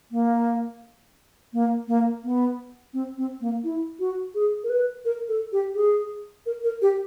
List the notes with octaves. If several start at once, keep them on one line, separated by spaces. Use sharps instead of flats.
A#3
A#3
A#3
B3
C4
C4
A#3
E4
F#4
G#4
A#4
B4
A#4
A4
G4
G#4
A#4
A#4
G4